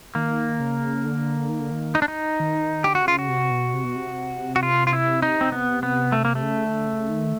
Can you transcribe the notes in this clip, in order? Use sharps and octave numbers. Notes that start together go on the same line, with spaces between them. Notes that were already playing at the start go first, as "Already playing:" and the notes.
D#3 A#3
C#3
D3
D#3
D3
D#3
D#4
D4
D#4
D#3
D3 G4
F#4
C3
C#3 F4
F#4
C3
B2
C3
B2
C3
F#4
F4
F4
E4
D#4
C4
B3
B3
A3
A#3
A3
C#3
D3
C#3
D#3